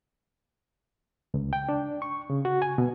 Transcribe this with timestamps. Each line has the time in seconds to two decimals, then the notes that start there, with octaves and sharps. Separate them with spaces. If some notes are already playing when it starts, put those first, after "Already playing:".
1.34 C#2
1.53 G5
1.69 D4
2.02 C#6
2.30 C#3
2.45 F#4
2.62 G#5
2.78 B2